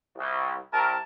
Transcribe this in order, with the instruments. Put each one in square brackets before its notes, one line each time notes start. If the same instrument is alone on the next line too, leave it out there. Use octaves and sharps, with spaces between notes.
[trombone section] C2
[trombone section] C2 C3 A#4 [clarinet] A5